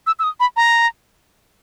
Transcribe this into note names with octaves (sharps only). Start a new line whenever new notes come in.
E6
E6
D#6
B5
A#5